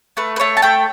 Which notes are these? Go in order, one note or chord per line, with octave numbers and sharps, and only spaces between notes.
A3 B4
B4
A3 C#5
A5
A3 G5